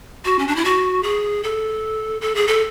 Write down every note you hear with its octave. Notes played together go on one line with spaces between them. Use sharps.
F#4
C#4
D4
E4
F#4
G#4
A4
A4
G#4
A4